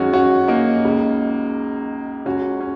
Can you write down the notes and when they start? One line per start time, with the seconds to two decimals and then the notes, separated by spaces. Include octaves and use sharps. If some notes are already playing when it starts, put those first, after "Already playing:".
Already playing: F#2 D#3 G#3 C#4 F#4
0.13 C#4 F#4
0.48 A#3 D#4
0.84 C#2 C#3
2.25 C#2 C#3 C#4 F#4
2.61 C#4